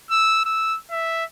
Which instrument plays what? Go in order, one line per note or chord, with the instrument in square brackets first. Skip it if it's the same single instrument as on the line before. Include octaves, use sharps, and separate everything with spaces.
[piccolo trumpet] E6
E6
E5